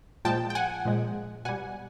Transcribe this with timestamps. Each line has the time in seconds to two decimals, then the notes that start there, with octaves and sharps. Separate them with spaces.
0.25 A#2 F3 G#3 G5 A5
0.50 G5
0.55 F#5 G#5
0.85 A#2 F3 G#3
1.45 B2 G3 F#5 G#5